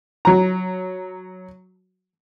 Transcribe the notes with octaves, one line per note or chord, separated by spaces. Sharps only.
F#3 A#5